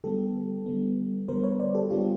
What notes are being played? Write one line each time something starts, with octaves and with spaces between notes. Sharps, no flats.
D3 G3 B3 G4 A4
D3 G3 B3
D3 G3 B3 A#4 C5
B4 C#5
C5 D5
G4 A4
D3 G3 B3 F4 G4